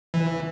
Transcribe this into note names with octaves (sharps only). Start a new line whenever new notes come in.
E3